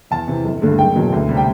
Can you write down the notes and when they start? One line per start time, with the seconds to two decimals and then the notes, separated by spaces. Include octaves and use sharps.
0.11 E2 A5
0.28 C3 E3
0.44 G1
0.62 G2 D3 A3
0.78 F#1 G5
0.95 E2 B2 F#3
1.12 D2
1.29 C3 G3
1.37 G5